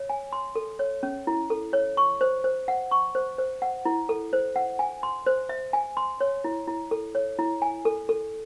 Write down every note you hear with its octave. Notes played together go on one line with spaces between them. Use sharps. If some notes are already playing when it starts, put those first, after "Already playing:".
Already playing: C#5
G#5
C6
A4
C#5
C#4
E4
A4
C#5
C#6
C5
C5
F#5
C#6
C5
C5
F#5
E4
A4
C5
F#5
G#5
C6
C5
E5
G#5
C6
C#5
E4
E4
A4
C#5
E4
G#5
A4
A4